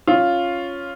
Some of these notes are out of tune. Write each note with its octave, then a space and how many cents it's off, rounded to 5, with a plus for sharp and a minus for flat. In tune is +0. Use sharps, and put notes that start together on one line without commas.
C#4 +0 F4 +0